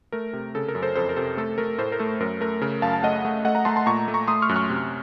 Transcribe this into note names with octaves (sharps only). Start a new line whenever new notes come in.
A3 A#4
C3
C#3 A4
A#4
F#2
A4 C5
F2 A4 C5
A#4
C3 A4 C5
A3 A4
A3 A#4
A2 A4 C5
A#4
A3 A4
F#2 A#4
A3 A#4
C#3 A#4
F#2 F5 A5
A5
A3 D#5 F#5
A3
A3 D#5 F#5
F#5 A#5
A3 A5 C6
A5 C6
A#2 A#5 C#6
A3
A#5 C#6
A3 C6 D#6
C#6 F6
F#2 F#6
C#6 F6
C3